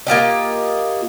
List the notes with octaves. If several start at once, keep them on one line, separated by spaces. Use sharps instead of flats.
A#3 F4 G4 D#5